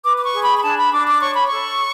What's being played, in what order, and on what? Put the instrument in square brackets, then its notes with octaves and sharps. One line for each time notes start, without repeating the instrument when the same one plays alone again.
[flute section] B4 D6
D6
C#6
G#4
B5
B5
D4 A5
B5
D4 D6
D6
C#5 C#6
B5
A4 C#6